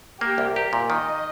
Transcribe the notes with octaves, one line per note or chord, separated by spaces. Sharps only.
A#3 G4
C2
G4 A#4
A#2
D#3 D#5